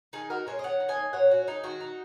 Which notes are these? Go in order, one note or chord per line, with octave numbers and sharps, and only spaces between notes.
D#3 D#4 G#4
D#4 F#4 A#4
G#3 G#4 C#5
D#5
D#3 C#5 F#5
D#4
D#5 G#5
A#3
A#2 C#5 F#5
C#4 F#4
G#3 D#4
D#3 F#4
D#4